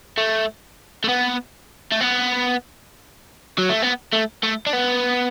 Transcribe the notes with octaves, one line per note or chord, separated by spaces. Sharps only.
A3
A3
B3
A3
B3
F#3
A3
B3
A3
A3
D4
B3